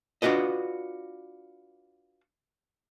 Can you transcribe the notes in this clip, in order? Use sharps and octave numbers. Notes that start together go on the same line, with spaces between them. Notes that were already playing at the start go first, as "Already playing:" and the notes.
D4 F4 F#4 B4 D#5